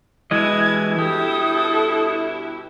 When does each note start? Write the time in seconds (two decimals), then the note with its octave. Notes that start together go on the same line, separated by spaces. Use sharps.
0.31 G2 B2 E3 G#3 E4 D#5 G#6
0.98 G4 A4 D#6